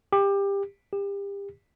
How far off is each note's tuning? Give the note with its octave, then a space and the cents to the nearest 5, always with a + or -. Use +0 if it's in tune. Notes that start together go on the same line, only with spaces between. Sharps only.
G4 +20
G4 +30